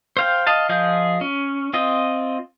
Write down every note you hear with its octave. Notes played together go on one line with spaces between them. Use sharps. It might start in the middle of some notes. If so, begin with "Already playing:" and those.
C5 F5 G5
D#5 F5 A5
F3 G#4 D#5 F5 G6
C#4
C4 F4 D#5